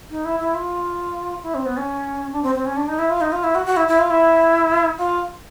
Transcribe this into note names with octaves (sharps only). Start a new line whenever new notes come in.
D#4
E4
E4
F4
E4
C4
B3
C#4
D4
C4
C4
C#4
D4
D#4
E4
F4
D#4
F4
E4
F#4
F#4
E4
E4
F4
E4
F4